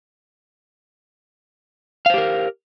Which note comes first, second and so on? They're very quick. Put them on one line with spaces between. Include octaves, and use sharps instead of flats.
F5 C5 G4 A#4